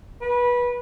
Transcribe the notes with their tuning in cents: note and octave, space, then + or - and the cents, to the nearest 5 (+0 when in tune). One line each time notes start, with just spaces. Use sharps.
B4 -20